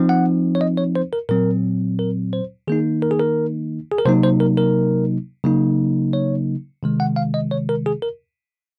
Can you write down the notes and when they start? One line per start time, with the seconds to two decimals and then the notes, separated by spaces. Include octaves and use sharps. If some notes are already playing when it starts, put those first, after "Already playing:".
Already playing: F3 C4 D#4
0.09 F#5
0.55 C#5
0.61 D#5
0.77 C#5
0.96 C5
1.13 A#4
1.29 A#2 F#3 C4 A#4
1.99 A#4
2.33 C5
2.67 D#3 A#3 D#4 G#4
3.02 A#4
3.11 G#4
3.19 A#4
3.91 G#4
3.98 A#4
4.05 C3 F#3 A#3 D#4 C5
4.23 C5
4.40 A#4
4.57 A#4
5.44 C#3 F#3 A#3 D#4
6.13 C#5
6.83 C3 D#3 G#3
7.00 F#5
7.16 F5
7.34 D#5
7.51 C#5
7.69 A#4
7.86 G#4
8.02 A#4